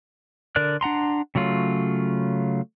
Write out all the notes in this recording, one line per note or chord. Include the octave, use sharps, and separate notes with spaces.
D3 A#4 D5 F#6
D4 F#5 A#5 C6
C#3 F#3 A3 F4